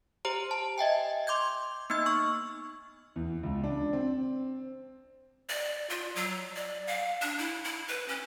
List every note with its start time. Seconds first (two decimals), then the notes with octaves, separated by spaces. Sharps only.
0.25 G4 C5 A#5
0.51 A5
0.78 D#5 E5 G5 G#5
1.27 C6 D6 G6 G#6
1.90 A#3 B3 D#4 E6 G#6
2.06 C#6 F6
3.16 E2
3.43 C#2
3.64 D4
3.93 C4
5.49 D5
5.90 F4
6.15 F#3
6.56 D5
6.87 F5
7.21 D4
7.38 E4
7.64 E4
7.88 B4
8.08 C#4